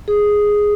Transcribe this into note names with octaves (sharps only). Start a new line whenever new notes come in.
G#4